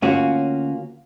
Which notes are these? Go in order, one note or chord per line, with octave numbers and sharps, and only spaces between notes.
D2 A#3 C#4 F4 F#4